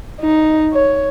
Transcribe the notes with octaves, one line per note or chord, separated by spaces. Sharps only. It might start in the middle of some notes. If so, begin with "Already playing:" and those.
D#4
C#5